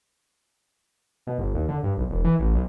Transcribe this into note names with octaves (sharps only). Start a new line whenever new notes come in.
B2
G1
D#2
D3
G2
B1
E1
E3
A1
B1